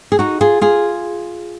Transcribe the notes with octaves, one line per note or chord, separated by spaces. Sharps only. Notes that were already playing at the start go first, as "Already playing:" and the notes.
G#4
D#4 F#4
F4 G#4
F4 G#4